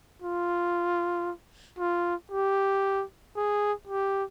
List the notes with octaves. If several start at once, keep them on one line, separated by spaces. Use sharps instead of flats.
F4
F4
G4
G#4
G4